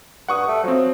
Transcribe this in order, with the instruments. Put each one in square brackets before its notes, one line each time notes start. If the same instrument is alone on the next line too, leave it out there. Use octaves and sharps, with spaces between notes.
[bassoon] G2 [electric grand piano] F#5 C#6 D#6
[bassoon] A3
[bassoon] F3 [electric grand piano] F#3 C4